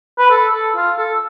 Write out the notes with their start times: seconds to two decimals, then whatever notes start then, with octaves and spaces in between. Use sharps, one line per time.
0.19 B4
0.31 A4
0.53 A4
0.76 F4
0.98 A4